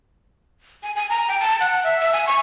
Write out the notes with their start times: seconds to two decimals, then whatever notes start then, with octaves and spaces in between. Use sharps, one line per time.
0.83 G#5
0.96 G#5
1.10 A#5
1.28 G5
1.41 A5
1.61 F#5
1.84 E5
2.00 E5
2.13 G#5
2.27 C#6